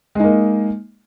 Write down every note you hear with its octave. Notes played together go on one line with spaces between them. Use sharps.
G#3 A#3 D#4